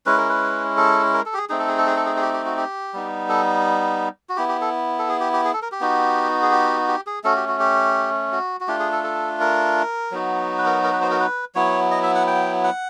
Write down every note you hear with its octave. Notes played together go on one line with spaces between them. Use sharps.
G#3 C#4 E4 B4
A#4
B4
A4
A#4
A4
G4
G#4
A3 C4 D#4 G#4
A4
G#4
A4
G#4
A4
G#4
G#4
G4
G4
F#4
G4
G3 B3 D#4
A4
F#4
B3 E4 G4
G4
A4
A4
G#4
G4
G4
G#4
A4
A#4
G4
B3 D#4 F#4
G#4
G4
G4
G#4
A3 C#4 F#4 A4
G4
F#4
G4
F#4
F#4
A3 D4 F4 G4
G#4
A4
A4
A#4
F#3 B3 D#4 F#4
B4
A#4
A#4
B4
C5
A#4
B4
F#3 B3 E4 C#5
D#5
E5
F#5
G5
F#5